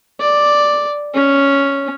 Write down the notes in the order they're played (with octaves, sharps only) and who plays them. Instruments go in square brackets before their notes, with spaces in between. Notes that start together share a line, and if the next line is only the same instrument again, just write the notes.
[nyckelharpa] D5
C#4